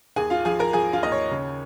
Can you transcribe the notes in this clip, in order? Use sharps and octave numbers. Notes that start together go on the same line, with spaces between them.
D#2 G#4 G#5
F4 F5
F3 G#4 G#5
A#4 A#5
F3 G#4 G#5
F4 F5
D#2 D#5
C#5
C#3